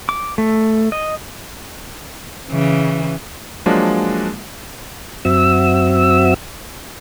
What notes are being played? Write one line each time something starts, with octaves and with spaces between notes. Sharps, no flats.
D6
A3
D#5
C#3 E3
F3 F#3 G#3 A#3 D4
F#2 C4 F#4 E5 E6